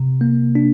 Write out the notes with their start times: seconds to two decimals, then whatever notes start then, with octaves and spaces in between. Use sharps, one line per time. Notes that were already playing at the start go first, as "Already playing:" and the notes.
Already playing: C3
0.21 A#3
0.55 D4